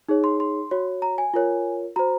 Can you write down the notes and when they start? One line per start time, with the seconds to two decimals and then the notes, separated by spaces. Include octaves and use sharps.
0.09 D#4 G#4 C#5
0.24 C6
0.40 C6
0.71 F#4 C#5
1.02 A#5
1.18 G#5
1.34 F4 A#4 C#5
1.96 F#4 C5 A#5